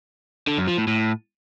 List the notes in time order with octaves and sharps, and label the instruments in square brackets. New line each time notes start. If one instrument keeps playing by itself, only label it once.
[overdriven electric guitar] D3
F#2
F3
A2
A2